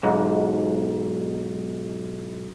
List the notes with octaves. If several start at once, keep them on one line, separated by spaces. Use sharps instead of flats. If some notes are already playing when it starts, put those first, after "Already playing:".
B1 G#2